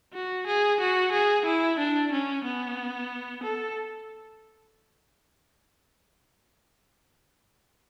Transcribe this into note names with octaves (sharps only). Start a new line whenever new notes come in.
F#4
G#4
F#4
G#4
E4
D4
C#4
B3
A4